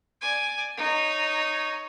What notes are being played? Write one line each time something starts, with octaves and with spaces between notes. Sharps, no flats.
D5 G#5
D#4 C#5